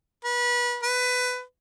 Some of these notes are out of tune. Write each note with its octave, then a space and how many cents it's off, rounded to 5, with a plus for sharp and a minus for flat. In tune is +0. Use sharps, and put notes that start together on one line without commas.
B4 -30
B4 +15